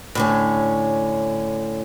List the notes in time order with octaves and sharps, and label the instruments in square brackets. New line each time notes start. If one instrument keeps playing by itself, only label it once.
[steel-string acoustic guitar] A2 D3 C#4